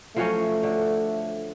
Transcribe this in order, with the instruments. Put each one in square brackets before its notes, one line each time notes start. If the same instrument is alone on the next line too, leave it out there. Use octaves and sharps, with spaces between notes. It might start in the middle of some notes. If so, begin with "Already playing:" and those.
[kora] F3 F#3 C#4 [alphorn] A3
[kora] D3